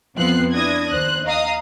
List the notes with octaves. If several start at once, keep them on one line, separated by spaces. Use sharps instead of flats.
F2 F3 B3 C4 F#6 C7
D4 E4 D#6 G#6 A#6
D#2 C5 F#6
D#5 F5 A#5 D#6